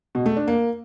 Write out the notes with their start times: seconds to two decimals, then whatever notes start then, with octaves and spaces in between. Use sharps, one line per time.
0.15 B2
0.26 A3
0.37 D4
0.48 A#3